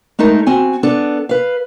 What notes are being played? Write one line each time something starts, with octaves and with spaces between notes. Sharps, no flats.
G#3 A3 D#4 A4 A#4
C4 F#4 G#5
B3 D4 A4
B4 F5